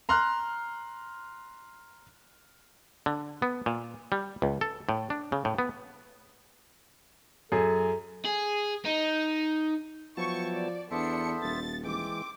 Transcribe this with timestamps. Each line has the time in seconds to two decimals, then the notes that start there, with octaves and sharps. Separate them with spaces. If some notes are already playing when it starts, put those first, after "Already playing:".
0.09 A#5 C6 F6 F#6
3.06 D3
3.42 B3
3.66 A#2
4.12 G3
4.42 C#2
4.61 A4
4.89 A2
5.10 D4
5.32 C#3
5.45 A2
5.59 B3
7.52 F#2 G#4 A4
8.25 G#4
8.86 D#4
10.17 F3 F#3 B3 E4 G5 A5 C#6
10.54 D5
10.91 E2 B3 D4 A4 C5 E5 C#7
11.43 D#1 A6
11.85 E3 G#3 C4 G5 D6